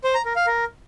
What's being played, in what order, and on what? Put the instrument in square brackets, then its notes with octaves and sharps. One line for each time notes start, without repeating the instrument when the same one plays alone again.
[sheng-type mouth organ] C5
A#5
A#4
F5
A#4